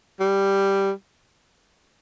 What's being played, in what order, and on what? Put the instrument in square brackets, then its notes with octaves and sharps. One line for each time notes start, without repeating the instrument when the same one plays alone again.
[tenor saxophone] G3